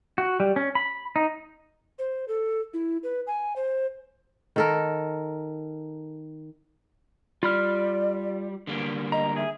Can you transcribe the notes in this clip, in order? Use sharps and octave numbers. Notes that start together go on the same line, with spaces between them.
F#4
G3
C#4
B5
D#4
C5
A4
E4
B4
G#5
C5
D#3 A4 A#4
G3 F4 D5 B5 F6
D3 G3 A#3
D#5 A#5
G#4 E5